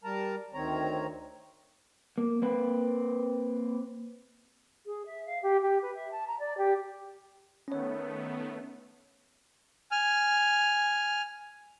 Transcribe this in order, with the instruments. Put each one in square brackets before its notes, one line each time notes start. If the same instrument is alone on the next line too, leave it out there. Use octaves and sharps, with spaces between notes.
[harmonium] G3 A#4 A5 A#5
D2 D#3 C4 C#5 A#5
[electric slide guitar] A#3
A#3 C4 B4
[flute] G#4
E5
F5
G4
G4
B4
E5
A5
A#5
D5
G4
[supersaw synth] D#3 A3 B3 [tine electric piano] C#4 C#5
[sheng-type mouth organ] G#5 F6